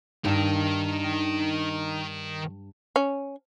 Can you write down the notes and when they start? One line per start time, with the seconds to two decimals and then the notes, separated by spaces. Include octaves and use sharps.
0.25 G2 D#3 D#4
2.96 C#4